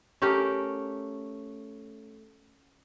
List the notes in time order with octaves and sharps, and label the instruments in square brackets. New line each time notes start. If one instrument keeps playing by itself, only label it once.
[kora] A3 C#4 G4 A#4